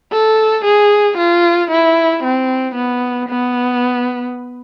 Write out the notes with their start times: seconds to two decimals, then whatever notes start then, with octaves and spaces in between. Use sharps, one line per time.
0.12 A4
0.65 G#4
1.17 F4
1.71 E4
2.23 C4
2.75 B3
3.29 B3